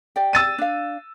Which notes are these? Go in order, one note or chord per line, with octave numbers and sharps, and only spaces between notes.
G4 D5 G5
E6 A6 D#7
D4 F5